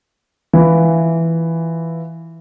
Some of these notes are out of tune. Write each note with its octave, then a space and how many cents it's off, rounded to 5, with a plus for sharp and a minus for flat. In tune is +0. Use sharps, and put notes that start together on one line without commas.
E3 +0 F4 +0